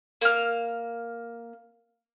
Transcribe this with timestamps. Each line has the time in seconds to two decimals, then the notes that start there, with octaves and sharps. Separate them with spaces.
0.21 A#3 F6